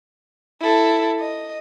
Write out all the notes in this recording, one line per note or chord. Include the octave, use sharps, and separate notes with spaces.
E4 A4
D#5